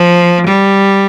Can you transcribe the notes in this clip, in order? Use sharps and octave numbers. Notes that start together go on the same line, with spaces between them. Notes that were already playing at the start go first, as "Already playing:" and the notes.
Already playing: F3
G3